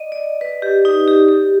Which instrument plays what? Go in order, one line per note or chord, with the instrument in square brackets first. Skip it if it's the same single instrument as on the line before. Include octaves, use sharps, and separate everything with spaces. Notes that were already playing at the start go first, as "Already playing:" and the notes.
Already playing: [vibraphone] D5 D#5
D5
B4
G4
D#4
G4
G4